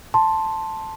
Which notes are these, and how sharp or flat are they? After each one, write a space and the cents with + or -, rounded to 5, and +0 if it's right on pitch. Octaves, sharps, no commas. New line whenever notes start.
A5 +0 C6 +10